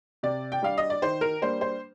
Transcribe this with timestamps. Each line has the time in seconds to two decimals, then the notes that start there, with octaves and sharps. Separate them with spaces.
0.23 C3 D5
0.52 G5
0.62 G3 D4 F5
0.78 D#5
0.90 D5
1.02 D#3 C5
1.21 A#4
1.41 G3 A#3 D4 C5
1.61 C5